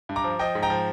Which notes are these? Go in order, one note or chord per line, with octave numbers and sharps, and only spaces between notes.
G2
A#5 D6
F3
F3 D#5 G5
G#2
G5 A#5
F3